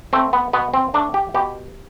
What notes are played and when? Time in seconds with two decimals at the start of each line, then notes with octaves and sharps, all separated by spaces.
0.13 A3 C4
0.33 B3
0.53 B2 B3
0.74 C4
0.94 A3 D4
1.14 G4
1.34 B2 G4